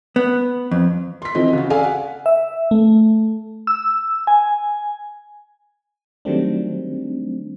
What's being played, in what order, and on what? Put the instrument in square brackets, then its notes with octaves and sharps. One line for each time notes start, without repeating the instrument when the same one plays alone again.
[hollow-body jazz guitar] B3
F2
[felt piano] C6 B6
E3 F3 C4 D#5
C#3 F#4
G#4 A4 D5 F5 G#5
F#5
[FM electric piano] E5
A3
E6
G#5
D#3 F#3 G3 A3 C4 D4